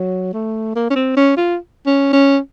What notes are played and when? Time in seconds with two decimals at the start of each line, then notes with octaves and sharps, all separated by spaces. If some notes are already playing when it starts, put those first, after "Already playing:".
Already playing: F#3
0.33 A3
0.75 A#3
0.90 C#4
0.95 C4
1.17 C#4
1.37 F4
1.86 C#4
2.13 C#4